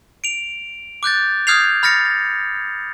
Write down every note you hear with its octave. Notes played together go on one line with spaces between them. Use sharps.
D7 F7
D6 F#6 G6 A6
D#6 F6 G6 G#6 C7 F7
B5 F6 A6 A#6 C#7